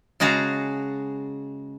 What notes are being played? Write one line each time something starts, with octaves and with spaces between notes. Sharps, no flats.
C#3 G#3 F#4 A5 A#5